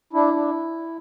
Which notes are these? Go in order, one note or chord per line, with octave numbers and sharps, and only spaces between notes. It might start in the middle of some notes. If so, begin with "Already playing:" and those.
D4 E4
D4